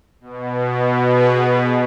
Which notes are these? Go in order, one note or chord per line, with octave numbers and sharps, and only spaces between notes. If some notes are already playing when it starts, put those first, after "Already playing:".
B2
G#4 B4